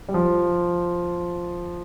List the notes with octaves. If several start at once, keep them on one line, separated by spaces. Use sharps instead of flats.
G3
F3